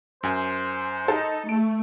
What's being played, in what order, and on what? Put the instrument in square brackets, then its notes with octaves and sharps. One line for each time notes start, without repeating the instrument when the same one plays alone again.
[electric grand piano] F#2 G#5 [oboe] C5
[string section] D#4 [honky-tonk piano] A4
[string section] A3 [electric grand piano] D7